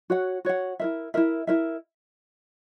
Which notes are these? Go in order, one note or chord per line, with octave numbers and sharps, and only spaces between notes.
F#4 C#5 F#5
F#4 C#5 F#5
E4 A#4 E5
E4 A#4 E5
E4 A#4 E5